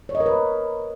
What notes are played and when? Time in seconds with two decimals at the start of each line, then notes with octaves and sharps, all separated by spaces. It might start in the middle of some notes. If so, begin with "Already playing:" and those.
0.09 C#5
0.15 D#5
0.20 A#4
0.26 B4